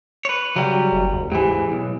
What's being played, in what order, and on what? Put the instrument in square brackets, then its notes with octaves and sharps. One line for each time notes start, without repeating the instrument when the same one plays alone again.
[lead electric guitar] B4 C#5
[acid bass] C#3 [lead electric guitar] F#3 G3
[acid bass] F#1
D#2
[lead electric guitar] G#2 E3 [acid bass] G4
[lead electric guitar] B1